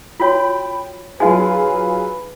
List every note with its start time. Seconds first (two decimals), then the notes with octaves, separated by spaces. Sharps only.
0.20 F4 F#4 C#5 G5 B5
1.20 F#3 D#4 F4 F#4 G#4 B4 G#5